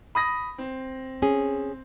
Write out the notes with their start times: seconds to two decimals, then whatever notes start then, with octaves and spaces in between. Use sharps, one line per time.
0.15 B5 D#6 A#6
0.58 C4
1.22 C#4 G#4